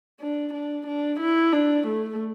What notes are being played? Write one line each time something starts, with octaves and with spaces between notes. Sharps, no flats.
D4
D4
D4
E4
D4
A3